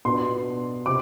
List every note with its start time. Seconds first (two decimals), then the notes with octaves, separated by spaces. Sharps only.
0.05 B2 B3 D4 C6
0.86 C3 D6